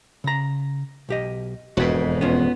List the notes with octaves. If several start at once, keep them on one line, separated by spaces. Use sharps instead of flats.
C#3 A#5
B1 G4 D#5
E1 F2 G#2 F#4 B4
B3 C#4 F4